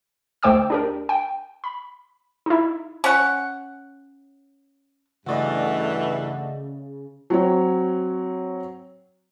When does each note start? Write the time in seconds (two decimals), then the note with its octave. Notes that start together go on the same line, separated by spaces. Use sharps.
0.43 D2 A3 C5 G5 D6 E6
0.70 D4 G4 A#4
1.09 G5
1.64 B5
2.46 D#4 E4
3.04 C#4 C#5 F#5
5.26 G2 C#3 E3 A3 F#4 D5 D#5
7.30 F#3 C4 C#5